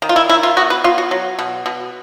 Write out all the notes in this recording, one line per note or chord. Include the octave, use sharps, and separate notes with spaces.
D#3
F4
E4
D#3 E4
F4
B3 F#4
B4
B3 F4
F#4
F#3
B2
B2